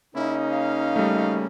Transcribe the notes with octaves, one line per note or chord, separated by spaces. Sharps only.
C#3 A#3 C#4 D#4 E4
F5
G3 A3